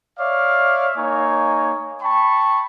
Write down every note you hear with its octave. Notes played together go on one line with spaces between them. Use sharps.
C#5 D5 E5 F5
A#3 D#4 C#5 G#5
G5 A5 B5 C#6